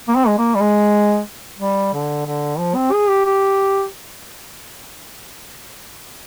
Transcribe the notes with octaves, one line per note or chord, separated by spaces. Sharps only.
A#3
C4
G#3
A#3
G3
G#3
G3
D3
D3
F3
C4
G#4
G4
G4